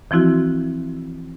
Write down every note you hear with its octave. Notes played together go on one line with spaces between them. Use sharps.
E3 F3 C4 E4 F#4